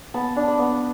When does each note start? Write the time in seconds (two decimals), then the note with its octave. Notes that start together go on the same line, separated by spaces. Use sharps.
0.14 B3 A5
0.36 D4
0.48 B5
0.59 B3